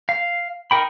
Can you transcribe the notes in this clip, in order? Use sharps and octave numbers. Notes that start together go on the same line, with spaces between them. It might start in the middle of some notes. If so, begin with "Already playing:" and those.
F5
D#4 A#4 G5 B5